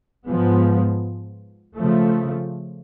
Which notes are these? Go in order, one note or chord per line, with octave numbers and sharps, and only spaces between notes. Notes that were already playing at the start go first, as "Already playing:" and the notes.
G#2 F3 G#3 B3
C#3 F3 A3